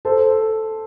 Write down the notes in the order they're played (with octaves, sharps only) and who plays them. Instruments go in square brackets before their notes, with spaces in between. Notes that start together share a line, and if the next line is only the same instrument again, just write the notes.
[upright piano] A4 C5